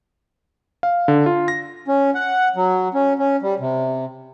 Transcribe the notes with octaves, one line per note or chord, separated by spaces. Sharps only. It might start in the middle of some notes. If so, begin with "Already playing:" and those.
F5
D3
F4
A#6
C#4
F#5
F#3
C#4
C#4
G3
C3